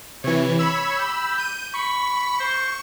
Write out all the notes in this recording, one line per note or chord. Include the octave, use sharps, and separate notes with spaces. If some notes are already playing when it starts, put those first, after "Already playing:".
C3 E3 C#5
B5 E6
G4
G6 D#7
B5 C#6
C5